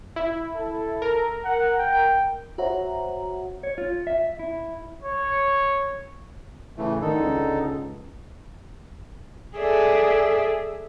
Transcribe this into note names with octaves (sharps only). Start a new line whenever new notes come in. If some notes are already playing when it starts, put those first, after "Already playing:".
E4
A4
A#4
F#5
G5
F#4 C5 C#5 E5 F#5 A#5
C#5
F4
E5
E4
C#5
A2 C#3 E3 A3
D3 D#3 D#4 A4
C#2
G#4 A4 D5 E5